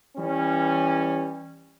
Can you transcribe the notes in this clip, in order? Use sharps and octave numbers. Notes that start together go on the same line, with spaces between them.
E3 G3 C#4